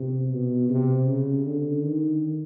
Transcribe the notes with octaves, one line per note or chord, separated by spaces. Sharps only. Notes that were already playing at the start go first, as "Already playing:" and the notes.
Already playing: C3
B2
C3
C#3
D3
D#3